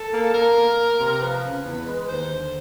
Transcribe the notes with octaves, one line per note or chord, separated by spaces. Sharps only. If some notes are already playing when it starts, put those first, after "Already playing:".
Already playing: A4
A#3
A#3 A#4
A#3
A#3
C3
F3 B4
C#3
E2
G#3
D#2 C5
D3